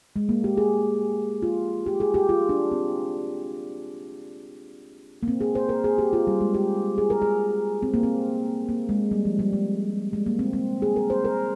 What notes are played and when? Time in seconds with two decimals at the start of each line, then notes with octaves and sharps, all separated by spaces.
0.16 G#3
0.29 A#3
0.44 G4
0.57 G#4
1.42 F4
1.86 G4
2.00 G#4
2.14 G4
2.29 F4
2.49 D4
2.71 C4
5.23 A#3
5.28 C4
5.41 G#4
5.55 C5
5.69 A#4
5.84 G#4
5.98 G4
6.13 F4
6.27 G3
6.41 G#3
6.54 G4
6.98 G#4
7.10 A#4
7.22 G#4
7.83 C4
7.94 A#3
8.03 C4
8.69 A#3
8.89 G#3
9.11 G3
9.25 F3
9.39 G3
9.53 G#3
10.13 G#3
10.26 A#3
10.39 C4
10.53 C4
10.82 G#4
10.96 A#4
11.10 C5
11.25 A#4